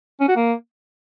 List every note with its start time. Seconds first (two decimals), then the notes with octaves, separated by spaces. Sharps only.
0.20 C#4
0.28 F#4
0.36 A#3